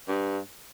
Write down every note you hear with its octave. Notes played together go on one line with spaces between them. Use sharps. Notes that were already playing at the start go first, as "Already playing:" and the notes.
G2